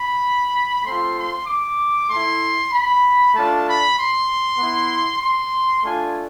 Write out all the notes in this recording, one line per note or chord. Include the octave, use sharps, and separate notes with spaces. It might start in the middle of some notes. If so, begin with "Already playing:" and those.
Already playing: B5
A3 C4 F4 C6
C6
D6
A3 E4 C6
B5
A3 D4 F4 A5
B5
C6
B3 E4
C6
A3 D4 F4 G#5